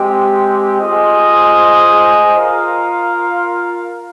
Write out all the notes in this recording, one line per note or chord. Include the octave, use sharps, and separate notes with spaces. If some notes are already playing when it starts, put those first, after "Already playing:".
Already playing: G#3 C4 G4
F4 G#4 C5 D#5
F4 A#4 F5